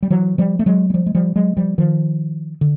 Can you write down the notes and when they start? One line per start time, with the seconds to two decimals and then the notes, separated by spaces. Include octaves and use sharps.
0.03 G3
0.10 E3 F#3
0.38 F3 G3
0.59 A3
0.66 F#3 G#3
0.90 G#3
0.94 F3 G3
1.06 G#3
1.15 F3 G3
1.36 F#3 G#3
1.57 F3 G3
1.78 D#3 F3
2.61 D3